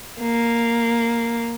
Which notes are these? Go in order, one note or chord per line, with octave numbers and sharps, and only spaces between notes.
A#3